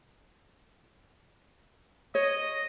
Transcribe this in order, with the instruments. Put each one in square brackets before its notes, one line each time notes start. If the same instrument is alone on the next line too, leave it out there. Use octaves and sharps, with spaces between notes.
[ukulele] C#5 [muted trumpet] D#5